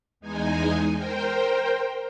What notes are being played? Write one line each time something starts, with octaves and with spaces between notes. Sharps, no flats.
E2 G#3 D#4 G#5
A#4 C5 G5